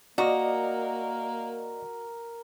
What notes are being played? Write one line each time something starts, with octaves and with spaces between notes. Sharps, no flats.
A#3 F#4 A#4 D5 D#5